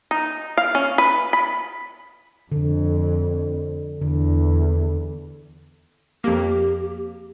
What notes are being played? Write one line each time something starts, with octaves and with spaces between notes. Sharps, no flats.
D#4
F5
C#4
B4
B5
F2 D3
E2 D3
F2 A#3 G4